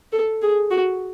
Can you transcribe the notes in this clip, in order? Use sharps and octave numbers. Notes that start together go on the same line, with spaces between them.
A4
G#4
F#4